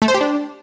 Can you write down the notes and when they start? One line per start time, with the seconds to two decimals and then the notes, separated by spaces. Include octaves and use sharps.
0.02 A3
0.08 C5
0.14 G4
0.21 D4